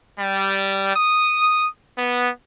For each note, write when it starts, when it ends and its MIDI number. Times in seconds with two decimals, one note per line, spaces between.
0.19 0.94 55
0.96 1.66 87
1.98 2.30 59